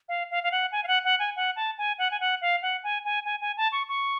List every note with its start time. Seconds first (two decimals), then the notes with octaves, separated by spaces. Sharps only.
0.09 F5
0.31 F5
0.43 F5
0.52 F#5
0.72 G#5
0.84 F5
0.88 F#5
1.05 F#5
1.19 G#5
1.36 F#5
1.56 A5
1.78 G#5
1.98 F#5
2.11 G#5
2.20 F#5
2.41 F5
2.62 F#5
2.84 G#5
3.05 G#5
3.25 G#5
3.41 G#5
3.57 A5
3.72 C#6
3.88 C#6